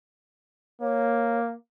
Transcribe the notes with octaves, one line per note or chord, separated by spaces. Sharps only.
A#3 C#5